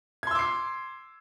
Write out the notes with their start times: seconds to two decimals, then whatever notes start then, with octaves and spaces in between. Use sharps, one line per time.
0.23 G#6
0.27 C6
0.31 E6
0.35 D6
0.39 C7